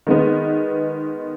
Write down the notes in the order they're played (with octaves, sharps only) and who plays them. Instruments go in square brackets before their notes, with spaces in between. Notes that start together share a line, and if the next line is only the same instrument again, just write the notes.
[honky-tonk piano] D#3 G#3 B3